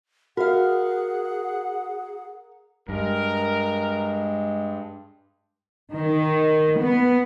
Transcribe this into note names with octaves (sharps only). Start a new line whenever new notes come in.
F#4 G#4 A#4 F5 F#5
G2 G#3 A#4
D#3
B3